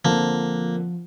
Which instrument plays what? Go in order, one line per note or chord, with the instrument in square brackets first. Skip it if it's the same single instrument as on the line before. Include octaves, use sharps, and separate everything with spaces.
[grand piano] D3 C4 A5 [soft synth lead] F3 [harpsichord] A#3